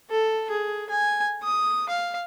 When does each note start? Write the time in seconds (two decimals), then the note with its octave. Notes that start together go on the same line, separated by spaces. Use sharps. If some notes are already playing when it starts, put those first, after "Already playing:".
0.10 A4
0.50 G#4
0.90 G#5
1.43 D#6
1.89 F5